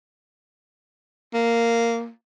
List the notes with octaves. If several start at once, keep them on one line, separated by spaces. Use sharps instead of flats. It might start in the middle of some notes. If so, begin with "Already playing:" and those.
A#3